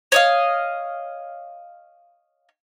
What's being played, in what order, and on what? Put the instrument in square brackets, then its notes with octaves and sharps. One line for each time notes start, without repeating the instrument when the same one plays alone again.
[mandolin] C#5 D#5 F5